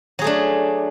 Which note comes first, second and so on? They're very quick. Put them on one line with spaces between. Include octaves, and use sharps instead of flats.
F#3 G#4 A3 D4